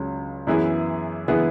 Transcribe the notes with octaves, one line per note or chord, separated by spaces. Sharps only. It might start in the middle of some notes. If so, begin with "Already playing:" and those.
Already playing: C#2 C#3 F#3
F#2 E3 B3 E4 G#4
E3 B3 E4 G#4